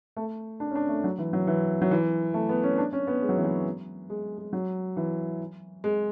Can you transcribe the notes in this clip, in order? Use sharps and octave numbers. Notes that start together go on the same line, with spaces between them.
A3
D4
C#4
D4
A3
F#3
E3
F#3
E3
F#3
E3
A3
B3
C#4
D4
C#4
B3
G#3
F#3
E3
F#3
G#3
G#3
F#3
E3
G#3